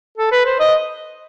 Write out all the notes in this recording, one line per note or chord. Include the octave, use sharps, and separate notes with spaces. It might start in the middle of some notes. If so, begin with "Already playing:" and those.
A4
B4
C5
D#5